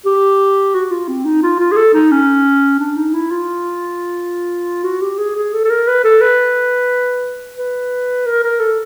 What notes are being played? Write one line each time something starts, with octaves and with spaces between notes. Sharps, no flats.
G4
F#4
F4
C4
D#4
F4
F4
G#4
A4
D#4
C#4
D4
D#4
E4
F4
F#4
G4
G#4
G#4
A4
A4
A#4
B4
A4
B4
B4
A#4
A#4
A4